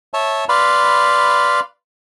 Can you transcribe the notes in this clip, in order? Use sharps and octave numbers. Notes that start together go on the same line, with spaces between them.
C#5 E5 A5
B4 D5 F5 B5 C6